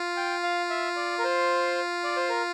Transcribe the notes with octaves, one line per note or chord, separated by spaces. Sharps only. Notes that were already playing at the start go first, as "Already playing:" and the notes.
Already playing: F4
G5
F5
E5
D5
A#4
C5
D5
C5
A#4